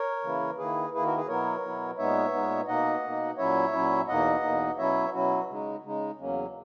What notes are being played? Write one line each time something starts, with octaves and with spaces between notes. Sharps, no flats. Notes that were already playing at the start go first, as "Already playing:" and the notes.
Already playing: A#4 C#5
C#3 E3 A#3 E4
D#3 A#3 E4 G#4 B4
D#3 A#3 E4 G#4 B4
F#4 A#4
G#4 B4
B2 F#3 B3 E4 A#4 C#5
B2 F#3 B3 E4
A#2 G#3 B3 D#4 C#5 E5
A#2 G#3 B3 D#4
B2 A#3 D#4 D#5 F#5
B2 A#3 D#4
A#2 F#3 C#4 E4 C#5 E5
A#2 F#3 C#4 E4
E2 B2 A#3 D#4 D#5 F#5
E2 B2 A#3 D#4
B2 F#3 C#4 E4 C#5 E5
B2 F#3 C#4 E4 F#4
C#3 G#3 D#4
C#3 G#3 D#4
E2 C#3 F#3 A#3 C#4